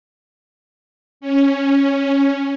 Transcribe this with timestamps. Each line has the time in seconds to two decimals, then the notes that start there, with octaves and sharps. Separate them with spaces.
1.21 C#4